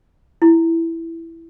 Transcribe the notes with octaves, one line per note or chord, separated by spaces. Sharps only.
E4